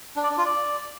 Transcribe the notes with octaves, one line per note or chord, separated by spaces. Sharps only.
D4
D5
D4
F4
D5